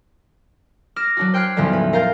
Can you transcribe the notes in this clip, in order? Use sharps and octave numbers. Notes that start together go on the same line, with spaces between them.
D6 F6 A#6 E7
F#3 D4 F#4
C5 G5 F6 F#6 G#6 C7
B1 E2 A2 D3 F3 G3
C#4 B4
A#4 F5 A#5 G6 A6